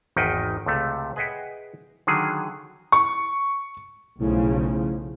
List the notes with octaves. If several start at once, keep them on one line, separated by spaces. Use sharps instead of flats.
G#1 E2 D#3 D#4 B4 G5
C#2 C3 A3
G#4 B4 D#5 E5 F#5 G5
D3 D#3 F#3 G#4
C#6
B1 A2 C#3 F3
A2